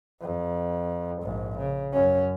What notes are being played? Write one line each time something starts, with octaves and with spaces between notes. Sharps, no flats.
F2
A#1 G#2
C#3
F#2 C#4